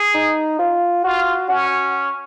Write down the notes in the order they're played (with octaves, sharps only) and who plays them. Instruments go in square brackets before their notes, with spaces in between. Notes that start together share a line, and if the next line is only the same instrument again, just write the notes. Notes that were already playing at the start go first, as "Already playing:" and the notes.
Already playing: [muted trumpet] G#4
[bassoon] D#4
F4
[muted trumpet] F4 [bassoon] F#4
[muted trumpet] C#4 [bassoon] F#4